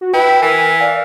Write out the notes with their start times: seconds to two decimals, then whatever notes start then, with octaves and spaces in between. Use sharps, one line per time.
0.01 F#4
0.13 E4 B4 G5
0.42 E3 A#4 G#5
0.80 D5 F5